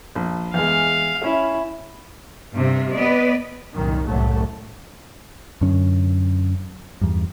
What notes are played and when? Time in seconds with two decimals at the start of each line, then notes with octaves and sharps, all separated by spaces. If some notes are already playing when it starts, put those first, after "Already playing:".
0.15 A#1
0.54 E2 G#3 F5
1.24 C#4 E4
2.53 G2 C3
2.93 B3 B4 D5 D#5
3.74 C2 F#2 A#2 D#3
4.07 F#1 C2 A2 F#3 A3
5.61 F#2 D3 C#4
7.01 E2 G2